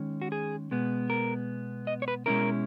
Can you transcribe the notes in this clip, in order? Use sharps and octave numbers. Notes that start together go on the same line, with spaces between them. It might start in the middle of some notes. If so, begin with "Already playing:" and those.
Already playing: D#3 G#3 C#4
F#4
G#4
B2 G#3 B3
A#4
D#5
C#5
B4
B2 G#3 C#4 E4 A#4